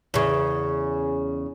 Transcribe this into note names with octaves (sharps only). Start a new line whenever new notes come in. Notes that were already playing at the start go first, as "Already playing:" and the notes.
E2 C#3